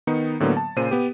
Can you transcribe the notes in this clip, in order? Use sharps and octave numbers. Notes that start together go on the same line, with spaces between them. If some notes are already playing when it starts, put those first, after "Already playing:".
D#3 B3 D#4 C#7
A2 D3 F#3 A#3 B3
A5
A#2 C#3 C5 D#7
B3 G4